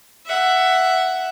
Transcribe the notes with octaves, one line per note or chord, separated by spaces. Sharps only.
E5 F#5